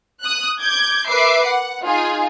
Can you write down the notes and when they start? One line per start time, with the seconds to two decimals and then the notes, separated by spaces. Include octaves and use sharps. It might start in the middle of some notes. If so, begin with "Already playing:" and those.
0.22 D#6 F#6
0.60 D6 G6 G#6
1.07 A#4 B4 E5 D6 C7
1.45 F#5
1.83 D#4 F4 G#4